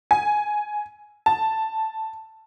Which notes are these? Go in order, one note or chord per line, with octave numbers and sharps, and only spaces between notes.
G#5
A5